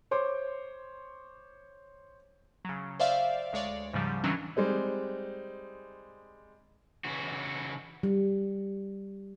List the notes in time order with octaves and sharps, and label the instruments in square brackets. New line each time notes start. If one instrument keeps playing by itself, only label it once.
[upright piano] C5 C#5 C6 D6
[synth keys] C#3 F#3
C5 D5 E5 F5
D2 G#3 C#5 D5
G#2 C#3 F3 G3
D#3 E3 F#3 G#3 C#4 D4
[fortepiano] G3 G#3 C4 D#4
[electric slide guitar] C#3 E3 F#4
[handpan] G3